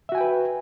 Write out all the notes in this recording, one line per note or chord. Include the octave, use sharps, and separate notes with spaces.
F#4 B4 E5 G5 G#5